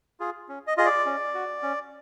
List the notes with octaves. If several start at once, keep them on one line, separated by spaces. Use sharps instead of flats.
F4 G#4
C#4
D#5
F4 G#4 D#5
D5
C#4
F#4
C#4